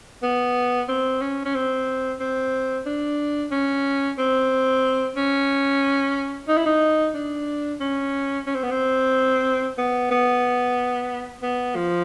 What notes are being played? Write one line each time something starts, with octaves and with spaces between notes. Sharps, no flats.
B3
C4
C#4
C#4
C4
C4
D4
C#4
C4
C#4
D#4
E4
D#4
D4
C#4
C#4
C4
B3
C4
B3
B3
B3
F3